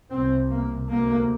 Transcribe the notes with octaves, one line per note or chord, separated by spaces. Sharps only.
C2 C3 C4
A#3
D2 C3 A#3